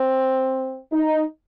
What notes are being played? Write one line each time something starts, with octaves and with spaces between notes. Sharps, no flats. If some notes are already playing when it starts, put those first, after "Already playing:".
Already playing: C4
D#4